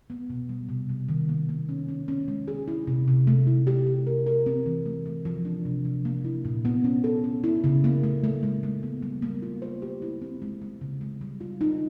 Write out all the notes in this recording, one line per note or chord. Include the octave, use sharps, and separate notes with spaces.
B3
B2
G3
C3
G3
D#3
A#3
A#3
C#4
C#4
C#4
G#3
G#4
E4
C3
C3
A3
E4
G4
G4
A#4
A#4
C4
E3
A3
A3
F3
D4
C3
F3
A#3
E4
A#2
B3
C#4
A4
C#4
E4
C#3
A#3
A3
A3
G#3
G#3
B3
G3
A#3
F4
C5
G4
E4
C4
G#3
G#3
C#3
G#3
G3
F4
D#4